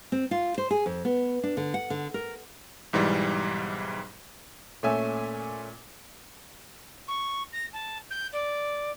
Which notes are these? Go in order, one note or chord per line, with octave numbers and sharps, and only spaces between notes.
C4
F4
C5
G#4
F2
B3
D4
D3
F#5
D3
A#4
B1 G#2 E3 G3
A#2 A3 C#4 E5 G#5 E6
C#6
A#6
A5
G6
D5